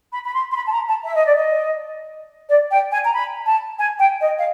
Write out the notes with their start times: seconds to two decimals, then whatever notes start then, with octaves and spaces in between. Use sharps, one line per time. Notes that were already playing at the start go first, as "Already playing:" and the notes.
0.12 B5
0.25 B5
0.34 C6
0.51 C6
0.56 B5
0.66 A5
0.72 A#5
0.88 A5
1.04 E5
1.15 D#5
1.26 D5
1.36 D#5
2.49 D5
2.71 G5
2.92 G#5
3.05 A#5
3.14 B5
3.46 A5
3.79 G#5
3.99 G5
4.21 D#5
4.38 F5